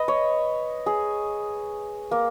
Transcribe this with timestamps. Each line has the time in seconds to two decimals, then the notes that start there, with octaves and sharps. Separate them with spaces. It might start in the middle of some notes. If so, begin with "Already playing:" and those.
Already playing: B4 D#5
0.08 C#5
0.86 G#4
2.11 A#3